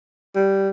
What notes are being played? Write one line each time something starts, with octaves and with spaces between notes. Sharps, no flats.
G3